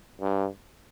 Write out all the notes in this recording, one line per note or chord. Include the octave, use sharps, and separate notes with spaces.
G2